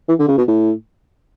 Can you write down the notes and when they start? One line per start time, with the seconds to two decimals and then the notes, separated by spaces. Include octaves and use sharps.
0.09 E3
0.19 D3
0.28 C#3
0.38 B2
0.48 A2